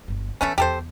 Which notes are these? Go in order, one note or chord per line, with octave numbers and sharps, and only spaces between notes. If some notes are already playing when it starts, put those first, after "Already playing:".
G1 D3
E3 A3 B3 C#4 E4
E2 G4 A4 C5